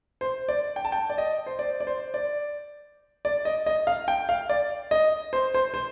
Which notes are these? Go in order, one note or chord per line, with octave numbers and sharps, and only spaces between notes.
C5
D5
G5
A5
G5
D5
D#5
C5
D5
D5
C5
D5
D5
D#5
D#5
F5
G5
F5
D5
D#5
C5
C5
C5